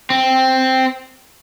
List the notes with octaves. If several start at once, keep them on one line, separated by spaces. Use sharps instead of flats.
C4